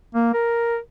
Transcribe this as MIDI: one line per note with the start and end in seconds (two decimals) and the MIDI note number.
0.15 0.33 58
0.34 0.78 70